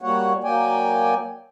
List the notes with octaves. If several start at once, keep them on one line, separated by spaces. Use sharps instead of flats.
G3 A#3 F#4 C#5 F#5
F#3 A#3 D5 G5 G#5